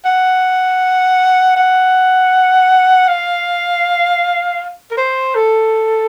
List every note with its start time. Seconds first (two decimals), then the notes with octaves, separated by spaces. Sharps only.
0.05 F#5
1.56 F#5
3.08 F5
4.91 A#4
4.97 C5
5.35 A4